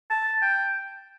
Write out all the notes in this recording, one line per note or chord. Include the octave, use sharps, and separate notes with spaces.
A5
G5